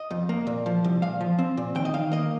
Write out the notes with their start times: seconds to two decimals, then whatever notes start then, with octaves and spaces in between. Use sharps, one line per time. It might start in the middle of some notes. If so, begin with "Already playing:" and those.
Already playing: D#5
0.11 F2
0.29 A#3
0.47 A#2
0.66 F3
0.84 C2
1.02 A#2 F5
1.21 F3
1.39 C4
1.57 A#2
1.75 D#2 G5
1.85 D#5
1.94 D#3 F5
2.12 A#3 D#5